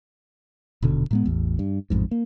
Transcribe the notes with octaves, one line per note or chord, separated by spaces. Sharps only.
D#1 B2 D3
A2 G#3 B3
A1 E2
G2
A1 F2 G#2
A#3